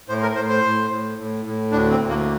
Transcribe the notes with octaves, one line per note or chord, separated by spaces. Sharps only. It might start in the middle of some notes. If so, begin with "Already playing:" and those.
A2 C5
A#4
A2 C5
C5
A2
A2
A2
A2
D2 D4
C4
D2
A#3